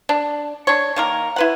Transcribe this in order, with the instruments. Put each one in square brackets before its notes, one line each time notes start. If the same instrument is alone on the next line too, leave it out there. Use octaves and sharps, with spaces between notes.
[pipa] D4
D4 C#5
D#3 A#3 A#4
E4 B4 F#5